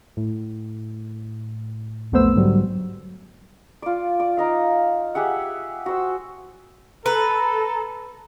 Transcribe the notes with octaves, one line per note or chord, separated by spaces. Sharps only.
A2
B1 F2 A3 B3 C5 E6
G#2 D3 F#3 G3
F4 D5
D5
D#4 D#5 F5
G4 G#4 E5 F#5
F#4 C5 E6
A4 B4 A#5